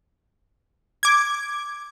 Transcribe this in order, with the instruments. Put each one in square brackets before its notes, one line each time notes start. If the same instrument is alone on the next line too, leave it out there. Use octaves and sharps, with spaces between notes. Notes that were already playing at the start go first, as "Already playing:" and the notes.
[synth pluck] D6 G#6